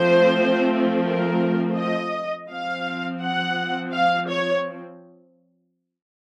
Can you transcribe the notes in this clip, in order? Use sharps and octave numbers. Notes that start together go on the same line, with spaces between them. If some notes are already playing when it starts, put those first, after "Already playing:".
Already playing: F3 A3 C4 C5
A#4
D#5
F3 C4 F5
F#5
F5
C#5